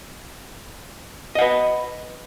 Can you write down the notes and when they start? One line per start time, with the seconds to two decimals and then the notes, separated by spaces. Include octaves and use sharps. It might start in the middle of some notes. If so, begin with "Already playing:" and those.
1.35 D#5
1.38 F#5
1.42 B4